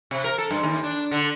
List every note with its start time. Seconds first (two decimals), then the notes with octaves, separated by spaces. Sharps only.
0.11 C3
0.24 A#4
0.38 A4
0.51 G2
0.63 D#2
0.84 D4
1.11 D3